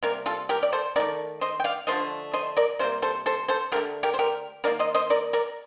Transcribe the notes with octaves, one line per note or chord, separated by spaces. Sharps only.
C3 G3 A#3 A#4
F4 A4
G4 A#4
D5
A4 C5
D#3 A3 A#4 D5
C5 D#5
G5
D5 F5
D3 F3 A3 C5 D#5
C5 D#5
A#4 D5
C3 G3 A#3 C5
A4 C5
A4 C5
A4 C5
D3 A3 G4 A#4
G4 A#4
C5
G4 A#4
D#3 A#3 A#4 D5
C5 D#5
C5 D#5
A#4 D5
A#4 D5